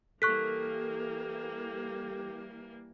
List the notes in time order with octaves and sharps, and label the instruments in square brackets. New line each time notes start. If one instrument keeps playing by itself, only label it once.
[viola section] E3 G3 A#3 [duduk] G4 [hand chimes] A4 [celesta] C#6 F#6 B6